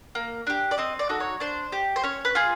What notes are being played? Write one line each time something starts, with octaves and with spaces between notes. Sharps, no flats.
A#3
D4 G4
D5
C4 D#5
D5
D#4 F#4 A4
C#5
D4 C5
G4
C5
C#4 C#5
B4
F4 G#4